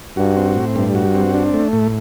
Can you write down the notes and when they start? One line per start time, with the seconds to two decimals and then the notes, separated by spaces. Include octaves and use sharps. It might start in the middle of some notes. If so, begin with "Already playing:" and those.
0.17 G2 F#4
0.37 C4
0.56 A2
0.76 G2 G3
0.95 F#4
1.15 C4
1.34 D4
1.54 A3
1.73 A2